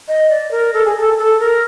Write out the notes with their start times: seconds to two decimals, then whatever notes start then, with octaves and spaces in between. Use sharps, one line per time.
0.08 D#5
0.30 D5
0.51 A#4
0.74 A4
0.85 G#4
0.96 A4
1.18 A4
1.40 A#4